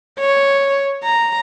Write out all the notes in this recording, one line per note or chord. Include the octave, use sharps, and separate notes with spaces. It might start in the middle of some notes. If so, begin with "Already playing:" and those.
C#5
A#5